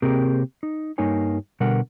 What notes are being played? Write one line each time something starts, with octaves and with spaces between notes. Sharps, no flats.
C3 A#3 C4 G4 G#4 A#4
D#4
G2 A#3 D#4 C#5 G#5
B2 D3 G3 A#4 F#5